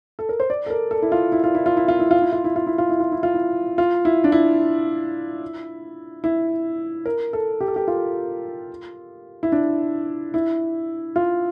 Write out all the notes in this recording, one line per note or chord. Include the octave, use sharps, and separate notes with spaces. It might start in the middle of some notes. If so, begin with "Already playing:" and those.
A4
A#4
C5
D5
A4
A#4
A4
E4
F4
E4
F4
E4
F4
E4
F4
E4
F4
E4
F4
E4
F4
E4
F4
E4
F4
E4
F4
E4
F4
E4
D4
E4
E4
A#4
A4
G4
A4
G4
F4
E4
D4
E4
F4